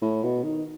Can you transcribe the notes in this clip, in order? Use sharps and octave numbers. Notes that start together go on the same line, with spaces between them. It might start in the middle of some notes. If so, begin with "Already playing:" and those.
A2
B2
D#3